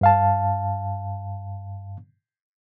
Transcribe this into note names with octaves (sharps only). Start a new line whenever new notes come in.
G2 F5 A5